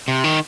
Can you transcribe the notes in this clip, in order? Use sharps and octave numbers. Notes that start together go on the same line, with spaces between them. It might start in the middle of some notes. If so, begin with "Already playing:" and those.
C3
D#3